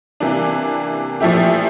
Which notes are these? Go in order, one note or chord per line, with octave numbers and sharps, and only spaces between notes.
C3 E3 A#3 D4
A#2 F3 A3 E4 G4